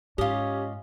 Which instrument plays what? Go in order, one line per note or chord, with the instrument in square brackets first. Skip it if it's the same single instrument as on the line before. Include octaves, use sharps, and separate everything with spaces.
[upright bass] G#2 [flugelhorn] C#4 [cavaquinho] F4 D#5 [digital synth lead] G4